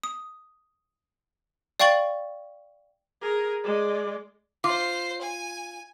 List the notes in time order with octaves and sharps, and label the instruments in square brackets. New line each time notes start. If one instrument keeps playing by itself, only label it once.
[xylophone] D#6
D5 F5 G5 C#6 A6 F#7
[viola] G#4 A#4
G#3 D5
[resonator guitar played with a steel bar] F4 [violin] C5 C7 [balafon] D6
[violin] G#5